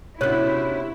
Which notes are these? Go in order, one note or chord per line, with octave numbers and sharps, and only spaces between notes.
C3 B3 C#4 D4 E4 F#4 C#5 F#6